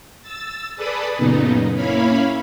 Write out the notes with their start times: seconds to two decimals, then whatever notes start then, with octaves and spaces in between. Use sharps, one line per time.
0.22 E6 A6
0.76 G#4 A4 B4 D5 B5 D#6
1.17 F#2 A#2 C#3 B3 D#4
1.75 A#3 C#4 E4 C#5 F5 B5